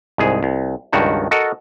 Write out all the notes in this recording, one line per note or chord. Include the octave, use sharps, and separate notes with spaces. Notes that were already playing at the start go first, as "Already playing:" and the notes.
C2 G#2 G#4
C2
C#2 G2 D#3 F#4 A5
F#4 A4 A#4 D#5